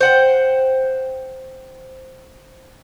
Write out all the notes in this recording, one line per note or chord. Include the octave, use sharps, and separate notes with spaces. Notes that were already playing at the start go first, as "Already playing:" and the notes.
C5 F#5 G5